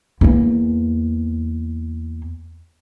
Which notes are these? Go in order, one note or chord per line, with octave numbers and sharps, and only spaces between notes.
E2 A#3